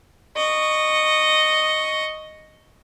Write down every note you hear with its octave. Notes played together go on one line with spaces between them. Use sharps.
D#5 C#6